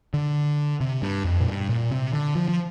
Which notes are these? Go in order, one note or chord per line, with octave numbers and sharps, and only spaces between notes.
D3
C3
G2
F2
A#2
G2
A#2
C3
D3
F3
F3